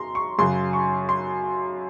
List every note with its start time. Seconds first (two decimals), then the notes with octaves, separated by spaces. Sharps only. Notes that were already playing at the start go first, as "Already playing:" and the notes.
Already playing: F#2 A#5 C6
0.15 C#6
0.38 F#2 C#3 F#3 C6
0.73 C#6
1.09 C6